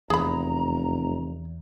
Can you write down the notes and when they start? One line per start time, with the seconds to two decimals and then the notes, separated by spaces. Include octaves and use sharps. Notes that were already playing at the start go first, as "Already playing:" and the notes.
0.10 F1 E2 G#4 A#5 B5